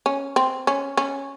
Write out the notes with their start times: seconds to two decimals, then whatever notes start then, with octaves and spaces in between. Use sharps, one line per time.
0.06 C#4
0.36 C4
0.67 C#4
0.97 C#4